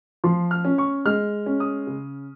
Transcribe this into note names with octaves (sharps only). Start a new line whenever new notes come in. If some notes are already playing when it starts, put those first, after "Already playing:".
F3 C6
F6
C#4
C#6
G#3 F6
C#4
D#6
C#3